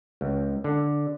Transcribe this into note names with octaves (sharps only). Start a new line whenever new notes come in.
C#2
D3